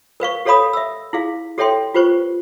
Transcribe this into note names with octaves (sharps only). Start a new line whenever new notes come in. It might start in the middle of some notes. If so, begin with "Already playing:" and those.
A#4 B4 F5 C#6
G4 A4 C#5 F5 B5 D#6
E5 E6
E4 G#4 F5
G4 A4 C#5 E5 G5 C6
F4 G4 B4 C5 C#6